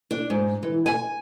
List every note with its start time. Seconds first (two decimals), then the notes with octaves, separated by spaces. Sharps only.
0.11 D4
0.30 G#2
0.63 E3
0.86 G#5